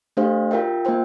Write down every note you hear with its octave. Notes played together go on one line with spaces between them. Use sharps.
A3 D4 G4 C5 F5
F4 A#4 E5 G5
A#3 F4 C5 G5